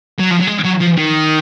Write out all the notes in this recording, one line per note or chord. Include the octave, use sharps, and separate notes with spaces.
F#3
F3
F#3
G#3
F#3
F3
D#3